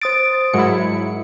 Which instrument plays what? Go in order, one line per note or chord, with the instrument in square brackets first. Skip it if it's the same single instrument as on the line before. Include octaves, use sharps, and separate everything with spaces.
[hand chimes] C5 D#6 D7 [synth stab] A6
[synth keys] G#2 F#3 C#7 [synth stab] G#3 E4 [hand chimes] A#4